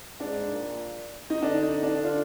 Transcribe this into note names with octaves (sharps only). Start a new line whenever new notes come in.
G#2 D4
A#2
D#4
D3 D4
D#4
D4
D4 F4